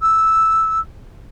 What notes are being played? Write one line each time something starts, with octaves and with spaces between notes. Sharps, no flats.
E6